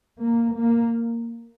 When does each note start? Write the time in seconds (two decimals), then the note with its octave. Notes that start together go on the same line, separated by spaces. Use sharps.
0.22 A#3
0.57 A#3